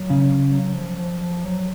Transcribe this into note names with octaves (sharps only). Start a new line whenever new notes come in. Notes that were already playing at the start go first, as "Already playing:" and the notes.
Already playing: F#3
C#3
F#3
F3
F3
F3
F#3